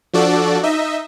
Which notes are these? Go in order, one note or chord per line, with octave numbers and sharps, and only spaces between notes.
F3 D4 F#4 A4 D5
D#4 D#5 E5